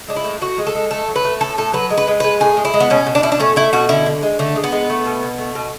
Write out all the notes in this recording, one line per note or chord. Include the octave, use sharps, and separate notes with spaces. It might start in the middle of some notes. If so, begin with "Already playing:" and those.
G#3 D4
E4
A2
A2 F#4
G#3
A4
G#3
A3 A4
F#3
B4
A3
A2 A4
A2 A4
F#3 B4
G#3
B4
G#3
G#3 B4
A2 G#4
G#3
E4
G#3
B3
B2 C#4
B2
D4
B2 E4
D4
A3 C#4
A3 E4
B2 F#4
D3 E4
D3
G#3
D3 A3
G#3
B3
G#3
A3
B2
B2
A3
B2